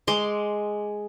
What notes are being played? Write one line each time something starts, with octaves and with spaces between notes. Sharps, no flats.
G#3 C6 D6